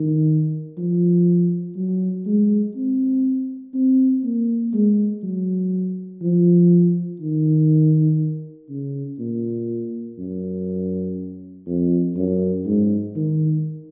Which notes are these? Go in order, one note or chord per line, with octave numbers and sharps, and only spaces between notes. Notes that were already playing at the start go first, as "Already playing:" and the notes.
Already playing: D#3
F3
F#3
G#3
C4
C4
A#3
G#3
F#3
F3
D#3
C#3
A#2
F#2
F2
F#2
G#2
D#3